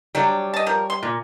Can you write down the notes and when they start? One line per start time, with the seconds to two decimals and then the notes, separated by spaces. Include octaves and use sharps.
0.15 C3 F#3 G3 D4 C#5
0.54 D#5 A5
0.66 F3 A#4
0.90 C6
1.03 A#2